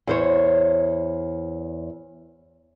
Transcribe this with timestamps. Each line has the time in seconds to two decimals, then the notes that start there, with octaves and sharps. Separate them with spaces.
0.07 E2 C5 C#5